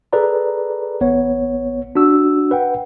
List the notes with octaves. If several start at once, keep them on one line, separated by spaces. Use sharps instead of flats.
G#4 A4 B4 D5 A#5
A1 B3 C#5
D4 F#4 E6
B4 F#5 G5